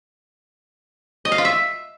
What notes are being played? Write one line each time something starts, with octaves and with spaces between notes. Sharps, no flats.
D#5
F5
F4
E5